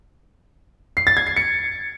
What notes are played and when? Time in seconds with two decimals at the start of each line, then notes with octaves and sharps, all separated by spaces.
0.97 C7
1.07 A6
1.17 G#6
1.27 C7
1.37 C#7